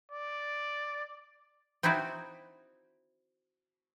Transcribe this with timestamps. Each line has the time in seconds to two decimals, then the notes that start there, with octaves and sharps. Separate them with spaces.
0.12 D5
1.83 C4 D#4 E4 F#4 D5